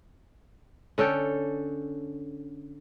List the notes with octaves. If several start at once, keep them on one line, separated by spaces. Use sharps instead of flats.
D3 C#4 A4 G5